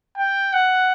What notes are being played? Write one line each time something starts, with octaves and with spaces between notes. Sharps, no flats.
G5
F#5